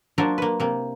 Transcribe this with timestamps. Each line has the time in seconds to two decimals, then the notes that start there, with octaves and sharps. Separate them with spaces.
0.18 F#3 A#3 D4 F4 A#4 C5
0.38 A#3 B4
0.60 C3 A#3